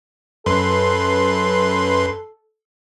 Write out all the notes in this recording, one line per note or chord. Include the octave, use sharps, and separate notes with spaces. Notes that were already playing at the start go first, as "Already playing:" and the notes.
F#2 A4 B4 C6